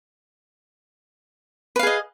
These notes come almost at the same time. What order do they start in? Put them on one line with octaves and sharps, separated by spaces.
B4 F5 G#4 D#5